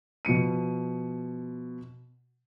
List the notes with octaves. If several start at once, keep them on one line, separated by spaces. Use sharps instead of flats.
B2 F3 C#7 D#7